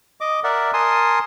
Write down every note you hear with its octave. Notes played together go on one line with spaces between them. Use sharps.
D#5 D6
A#4 D5 E5 F#5
A#4 G#5 A5 C6 D#6